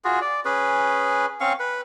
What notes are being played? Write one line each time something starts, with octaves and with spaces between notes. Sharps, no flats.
F4 F#4 G#4
D5
C#4 G#4 B4
C4 C#4 F5 C#6
B4